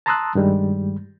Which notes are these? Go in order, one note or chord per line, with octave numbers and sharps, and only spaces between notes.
A5 A#5 C6 D#6 E6 F#6
G2 D#3 G3 G#3